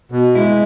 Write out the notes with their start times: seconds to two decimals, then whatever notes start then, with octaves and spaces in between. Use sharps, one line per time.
0.12 B2
0.35 G#3 E4